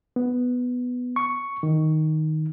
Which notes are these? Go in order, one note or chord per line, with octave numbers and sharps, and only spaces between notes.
B3
C#6
D#3